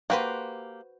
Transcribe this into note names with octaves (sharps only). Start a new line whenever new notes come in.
A#3 F#4 G4 B4 C5